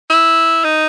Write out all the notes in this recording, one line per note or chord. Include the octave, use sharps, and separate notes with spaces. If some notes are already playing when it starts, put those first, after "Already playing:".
E4
D#4